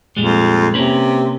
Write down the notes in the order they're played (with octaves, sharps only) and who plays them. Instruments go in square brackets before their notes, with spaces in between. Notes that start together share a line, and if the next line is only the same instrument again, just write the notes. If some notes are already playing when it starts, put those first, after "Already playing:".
[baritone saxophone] F2 [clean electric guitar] A#2 G3 G#3
[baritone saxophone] C3 [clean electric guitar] A#3 C#4 B4